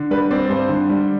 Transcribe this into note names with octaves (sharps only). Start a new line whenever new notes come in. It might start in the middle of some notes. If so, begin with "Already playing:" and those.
Already playing: D3
G3 B4
C4 D5
G2 C5
D3
G3